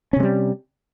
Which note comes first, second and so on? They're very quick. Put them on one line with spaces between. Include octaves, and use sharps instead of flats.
C#4 C3 G#3 G3